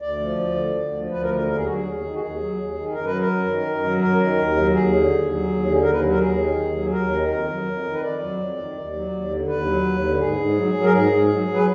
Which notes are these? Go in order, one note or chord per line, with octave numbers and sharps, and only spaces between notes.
D2 D5
F3
D2
D3
D2
F3
D2 B4
A#4
D3
A#4
D#2 A#4
G#4
F#3 F#4
G#4
D#2
D#3
F#4
D#2 G#4
F#3
D#2
D#3
F#2 A#4
B4
F#3
A#4
F#2
D#3
F#2
F#3
F#2 A#4
D#3
D#2
F#3
D#2 G#4
D3
D#2
F#3
D#2
D3
D#2 A#4
B4
F#3
A#4
D#2 G#4
D#3
D#2
F#3
D#2 A#4
D#3
F2 A#4
F#3
F2
D#3
B4
F2 D5
F#3
F2
D#3
D#2
F#3
D#2
D3
D#2 B4
F#3
D#2
D3
G#2 G#4
G#2
F#3
F#3
A#4
G#2 G#4
G#2
F#3
F#3
B4